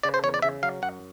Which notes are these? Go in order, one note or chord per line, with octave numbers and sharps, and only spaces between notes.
C#3 D5
C5
E2 C#5
D5
C#3 E5
F#3 F5
F#2 F#5